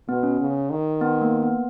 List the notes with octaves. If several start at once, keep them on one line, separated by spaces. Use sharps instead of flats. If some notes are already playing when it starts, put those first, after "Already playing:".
B2 B3
C#4
C#3
D#3
B3
A#3
B3